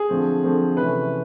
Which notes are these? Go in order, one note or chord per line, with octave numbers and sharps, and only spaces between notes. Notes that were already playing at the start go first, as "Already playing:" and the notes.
Already playing: G#4
D3 F3 A3 C4
D3 F3 A3 C4
C3 E3 A3 C#4 B4